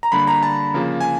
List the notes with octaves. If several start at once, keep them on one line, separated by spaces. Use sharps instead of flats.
A#5
D3 G3 A#3 B5
A#5
A5
C#3 F3 A#3
G#5